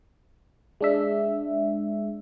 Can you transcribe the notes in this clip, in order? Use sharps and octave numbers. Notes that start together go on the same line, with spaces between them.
G#3 D4 E5